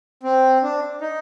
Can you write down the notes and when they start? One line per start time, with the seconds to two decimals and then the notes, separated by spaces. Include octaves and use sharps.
0.23 C4
0.63 D4
1.01 D#4